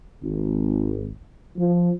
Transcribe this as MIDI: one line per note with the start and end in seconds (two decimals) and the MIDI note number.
0.22 1.07 32
1.57 1.91 53